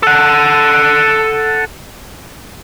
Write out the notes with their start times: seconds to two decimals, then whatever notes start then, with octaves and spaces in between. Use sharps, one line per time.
0.03 A4 F#5